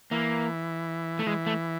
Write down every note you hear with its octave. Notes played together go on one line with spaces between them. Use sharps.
E3 A#3
A3
E3 G#3
A3